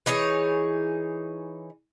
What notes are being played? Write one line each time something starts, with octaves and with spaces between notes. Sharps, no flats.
E3 D#4 G#4 C#5